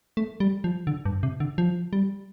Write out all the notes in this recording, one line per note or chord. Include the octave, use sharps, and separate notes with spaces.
A3
G3
F3
D3
G2
C3
D3
F3
G3